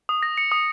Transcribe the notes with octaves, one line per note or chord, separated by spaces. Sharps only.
D#6
A#6
C#7
D#6